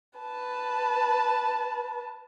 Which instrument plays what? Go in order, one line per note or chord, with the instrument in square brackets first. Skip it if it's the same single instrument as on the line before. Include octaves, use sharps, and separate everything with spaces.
[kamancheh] B4 A5